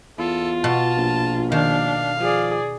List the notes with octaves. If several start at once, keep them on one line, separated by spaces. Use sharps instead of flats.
E2 F4 A4
B2 A5
A#1
D#3 D4 F5
F3 G#4 D5